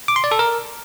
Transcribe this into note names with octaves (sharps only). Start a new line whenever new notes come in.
D6
C6
D5
A4
A#4